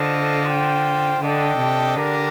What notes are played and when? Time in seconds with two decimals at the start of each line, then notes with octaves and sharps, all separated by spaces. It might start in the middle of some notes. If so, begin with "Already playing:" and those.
Already playing: D3 F4 A4 C5 D#5
0.45 F4 C5 G5
1.20 D3 D4 A4 D#5 G5
1.57 C3
1.95 D3 D4 G4 A#4